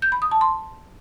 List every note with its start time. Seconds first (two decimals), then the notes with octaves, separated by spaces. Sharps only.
0.02 G6
0.12 B5
0.22 D#6
0.31 A5
0.41 C6